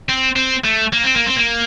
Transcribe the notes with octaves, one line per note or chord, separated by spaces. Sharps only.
C4
C4
A3
A#3
C4
A#3
C4
A#3